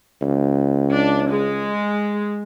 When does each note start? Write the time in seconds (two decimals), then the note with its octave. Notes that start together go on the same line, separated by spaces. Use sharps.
0.22 C#2
0.93 D4
1.29 G#3